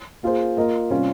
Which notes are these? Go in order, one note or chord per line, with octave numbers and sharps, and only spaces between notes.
A#3 F4 G#4 C5
A#3 F4 A#4 D#5
C3 G3 C#4 F4